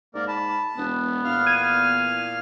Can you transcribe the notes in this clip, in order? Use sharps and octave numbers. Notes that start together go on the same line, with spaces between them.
G#2 A#3 A#4 D5
A5 B5
E1 B3
E2 A#2 F5 F6
G#6 D#7